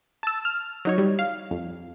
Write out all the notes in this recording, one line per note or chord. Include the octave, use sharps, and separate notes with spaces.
A5 E6
F6
F#3 D#4 C#5
G3
F5
F2